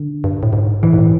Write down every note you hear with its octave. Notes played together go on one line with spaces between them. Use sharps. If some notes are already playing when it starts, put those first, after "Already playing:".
Already playing: D3
G2
A2
G#2
G#2 E3
G#2
A2